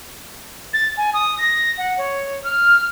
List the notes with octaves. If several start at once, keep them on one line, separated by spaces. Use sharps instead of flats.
A6
G#5
D#6
A#6
F#5
C#5
F6